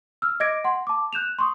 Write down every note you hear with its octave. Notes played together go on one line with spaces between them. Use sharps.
E6 F6
D#5 D6 G#6 A#6 D7
F#5 C6
A5 D6
F#6 G6 E7 F7
C6 C#6 D#6